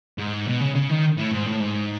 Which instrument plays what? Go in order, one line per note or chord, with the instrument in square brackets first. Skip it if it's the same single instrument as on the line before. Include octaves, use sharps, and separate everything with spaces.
[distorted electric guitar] G#2
B2
C#3
C#3
D#3
A2
G#2
A2
G#2